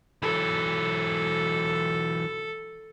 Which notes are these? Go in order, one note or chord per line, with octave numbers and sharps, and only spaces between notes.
E3 F#3 A4